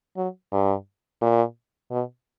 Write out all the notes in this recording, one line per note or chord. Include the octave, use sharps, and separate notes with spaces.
F#3
G2
A#2
B2